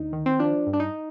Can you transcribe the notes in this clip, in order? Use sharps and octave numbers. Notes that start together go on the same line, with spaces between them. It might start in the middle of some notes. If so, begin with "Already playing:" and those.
Already playing: D2 D#4
D#3
C4
F3 D4
G2
D4
D#4